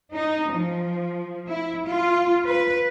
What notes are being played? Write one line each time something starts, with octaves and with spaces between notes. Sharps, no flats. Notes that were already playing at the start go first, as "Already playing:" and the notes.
D#4
F3
E4
F4
B4